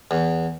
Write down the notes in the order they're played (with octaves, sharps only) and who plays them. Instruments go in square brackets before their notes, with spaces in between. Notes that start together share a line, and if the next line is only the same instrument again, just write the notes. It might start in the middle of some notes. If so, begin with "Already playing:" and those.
[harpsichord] E2